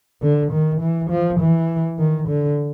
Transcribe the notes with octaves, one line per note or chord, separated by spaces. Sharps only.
D3
D#3
E3
F3
E3
D#3
D3